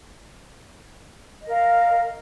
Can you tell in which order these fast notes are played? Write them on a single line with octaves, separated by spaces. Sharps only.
D#5 A#4 F5